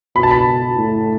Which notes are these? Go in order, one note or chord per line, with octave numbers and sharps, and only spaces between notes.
B2 B5
A5
B5
A2